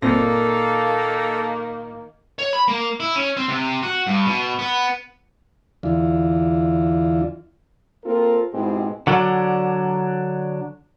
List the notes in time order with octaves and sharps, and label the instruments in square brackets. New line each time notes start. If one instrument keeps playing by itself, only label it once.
[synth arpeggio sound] G1 C4 A#6 [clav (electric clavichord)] A#2 [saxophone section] D#3 A#3 [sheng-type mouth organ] A4
[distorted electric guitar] C#5
B5
A#3
E4
C#4
C4
C3
F#4
G2
B2
B3
[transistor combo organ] E2 D3 E3 F4
[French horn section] A#3 C4 F4 A4 A#4
G#2 B2 G#3 C4 E4 G4
[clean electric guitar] D3 F#3 D4